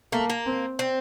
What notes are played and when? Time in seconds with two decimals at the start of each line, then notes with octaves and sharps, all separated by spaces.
0.12 A3 A#3
0.30 A#3
0.46 C4
0.79 C4